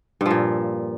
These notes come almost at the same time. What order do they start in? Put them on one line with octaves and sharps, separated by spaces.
G2 F3 A#2